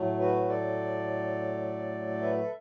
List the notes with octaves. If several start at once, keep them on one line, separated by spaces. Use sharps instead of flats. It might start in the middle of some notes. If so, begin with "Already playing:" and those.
Already playing: A2 F#3 A3
F#4 B4
A4 D5
B4 E5
A4